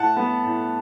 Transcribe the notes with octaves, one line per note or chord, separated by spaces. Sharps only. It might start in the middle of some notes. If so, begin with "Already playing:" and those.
Already playing: A2 F#5 A5
B3
A2